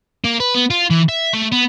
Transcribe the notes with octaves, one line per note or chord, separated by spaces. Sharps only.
A#3
B4
B3
F4
E3
E5
A3
B3